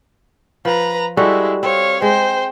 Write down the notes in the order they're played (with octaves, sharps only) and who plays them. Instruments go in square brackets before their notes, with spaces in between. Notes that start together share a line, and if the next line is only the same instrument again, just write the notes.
[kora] F3 [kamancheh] B4 A#5
[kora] G3 F#4 A4 [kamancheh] G#3 E4
[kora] C4 [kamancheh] C#5 F5
[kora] G#3 [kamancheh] C5 G5